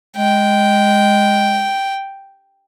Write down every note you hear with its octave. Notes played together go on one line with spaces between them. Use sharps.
G#3 G5